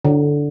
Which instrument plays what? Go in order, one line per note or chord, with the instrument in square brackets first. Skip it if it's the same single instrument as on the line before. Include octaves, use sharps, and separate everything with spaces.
[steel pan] D3